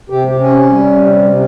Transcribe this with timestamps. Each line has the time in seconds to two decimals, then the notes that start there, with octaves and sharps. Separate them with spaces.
0.10 C3 G4
0.40 C#4
0.69 G3
1.00 C3
1.29 C3